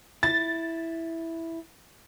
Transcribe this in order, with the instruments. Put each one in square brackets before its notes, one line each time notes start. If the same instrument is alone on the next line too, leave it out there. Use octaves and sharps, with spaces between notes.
[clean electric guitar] E4 [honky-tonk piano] A6